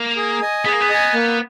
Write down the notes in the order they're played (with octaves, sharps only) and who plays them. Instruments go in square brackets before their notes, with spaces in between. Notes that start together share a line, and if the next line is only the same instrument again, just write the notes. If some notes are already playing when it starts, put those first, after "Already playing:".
Already playing: [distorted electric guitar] A#3
[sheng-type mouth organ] G#4
D#5 G#5
[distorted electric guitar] B3 [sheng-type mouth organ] G#4
[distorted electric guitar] A#3
B3
[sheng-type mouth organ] D#5 G#5
A#3